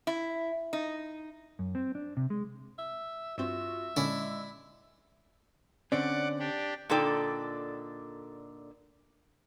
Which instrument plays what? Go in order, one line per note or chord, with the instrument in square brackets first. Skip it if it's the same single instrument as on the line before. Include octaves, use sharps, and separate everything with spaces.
[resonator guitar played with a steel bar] E4
D#4
[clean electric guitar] F#2
C4
D4
C3
G#3
[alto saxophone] E5
[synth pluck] G2 C4 [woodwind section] F4 F#4 [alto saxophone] E5
[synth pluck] A#2 D3 C#4 [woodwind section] G#3 [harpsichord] E4 D5
[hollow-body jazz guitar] D3 C4 C#4 [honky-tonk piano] D5 [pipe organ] F#5 D6
[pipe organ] D4 G4
[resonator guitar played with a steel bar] A#2 D3 D#4 A4 D5 G5